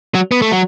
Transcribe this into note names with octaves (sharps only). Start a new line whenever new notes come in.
F#3
B3
A3
F#3